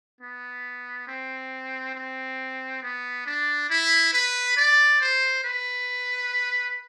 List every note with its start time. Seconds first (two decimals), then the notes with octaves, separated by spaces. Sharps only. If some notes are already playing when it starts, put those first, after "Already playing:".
0.21 B3
1.07 C4
1.95 C4
2.82 B3
3.26 D4
3.70 E4
4.13 B4
4.57 D5
5.01 C5
5.44 B4